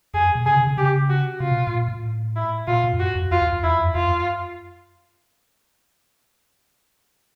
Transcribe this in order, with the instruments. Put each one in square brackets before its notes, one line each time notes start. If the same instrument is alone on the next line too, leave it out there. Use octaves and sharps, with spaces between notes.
[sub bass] F2 [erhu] G#4
[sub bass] F#2
B2
[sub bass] C3 [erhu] G#4
[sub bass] D3
C#3
[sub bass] C#3 [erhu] G4
[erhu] F#4
[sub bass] C3 [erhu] F4
[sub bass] B2
A2
A#2
A2
[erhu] E4
[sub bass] A#2 [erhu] F4
[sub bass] A#2
F2
[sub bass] F#2 [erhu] F#4
[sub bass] F2
[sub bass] F2 [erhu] F4
[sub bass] E2
F2
[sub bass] E2 [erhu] E4
[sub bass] F2
F#2
[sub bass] F2 [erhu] F4
[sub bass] F#2